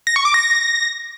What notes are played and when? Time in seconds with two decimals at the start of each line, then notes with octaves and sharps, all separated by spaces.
0.07 A#6
0.16 C#6
0.25 D6
0.34 A#6